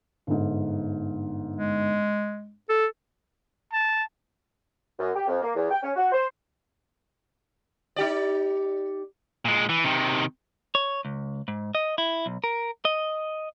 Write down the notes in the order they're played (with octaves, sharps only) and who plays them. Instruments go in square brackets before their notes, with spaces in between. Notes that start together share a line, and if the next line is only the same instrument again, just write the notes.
[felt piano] G1 G#2
[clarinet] G#3
A4
[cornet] A5
[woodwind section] F#2
G4
F2
A#3
E2
G5
C#4
F#4
C5
[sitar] D#4 G4 D5
[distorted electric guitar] A#2 G#3
E3
C3 D#3
[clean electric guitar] C#5
C#2
G#2
D#5
E4
B1
A#4
D#5